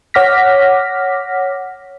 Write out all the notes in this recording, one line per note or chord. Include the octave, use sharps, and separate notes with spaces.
C#5 F#5 D6 F6 A#6 B6